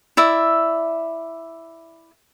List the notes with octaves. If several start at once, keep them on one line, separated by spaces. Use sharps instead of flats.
E4 D5 E5